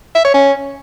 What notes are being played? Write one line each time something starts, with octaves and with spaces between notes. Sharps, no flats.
E5
C#5
C#4